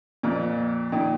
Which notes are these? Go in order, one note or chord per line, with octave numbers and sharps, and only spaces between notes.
F2 A#2
A#2 D#3